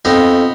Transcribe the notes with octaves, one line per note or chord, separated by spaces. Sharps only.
F2 B3 D#4